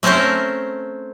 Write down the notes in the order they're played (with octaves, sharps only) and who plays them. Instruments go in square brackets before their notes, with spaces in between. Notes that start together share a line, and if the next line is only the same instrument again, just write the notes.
[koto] A3 C4 C#4 A#4 C5